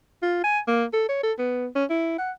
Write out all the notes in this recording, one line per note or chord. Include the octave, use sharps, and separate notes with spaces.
F4
G#5
A#3
A4
C#5
A4
B3
C#4
E4
F#5